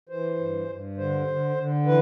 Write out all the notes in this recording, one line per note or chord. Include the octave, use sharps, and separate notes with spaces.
E3 C5
G2
G2
D3 C5
D3
D3
E3 B4